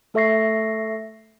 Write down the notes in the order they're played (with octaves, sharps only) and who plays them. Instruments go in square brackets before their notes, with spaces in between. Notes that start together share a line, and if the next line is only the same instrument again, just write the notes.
[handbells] A3 A4 E5 C#6 A#6 C7